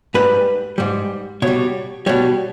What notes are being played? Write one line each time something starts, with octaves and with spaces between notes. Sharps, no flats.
G#2 G3 B4
G#2 G3
B2 C#5
G3
B2 G3 C#5